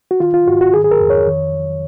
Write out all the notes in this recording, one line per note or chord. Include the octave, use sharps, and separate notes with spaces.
F#4
D#3 F4
F4
G#2 F#4
F#4
D#3 G#4
G#4
A#4
F2
C#5
D#3